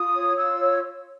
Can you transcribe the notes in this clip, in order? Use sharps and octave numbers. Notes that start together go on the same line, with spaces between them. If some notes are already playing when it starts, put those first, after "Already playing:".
Already playing: F4 D#6
C#5
F4 E6
C#5